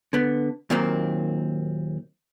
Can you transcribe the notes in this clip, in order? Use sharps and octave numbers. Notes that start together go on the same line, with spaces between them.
D3 B3
D#2 A#2 D#3 F#3 A#3 C4